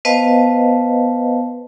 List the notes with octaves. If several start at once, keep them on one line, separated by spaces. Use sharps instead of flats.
B3 B4 C5 D#5 F5 A5